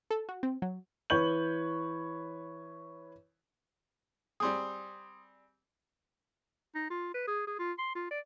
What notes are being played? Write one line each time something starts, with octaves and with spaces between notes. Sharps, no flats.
A4
F#4
C4
F#3
E3 B4 C#5 G6 F#7
G3 C4 G#4 C6 D#6
D#4
F4
B4
G#4
G#4
F4
C6
F4
D5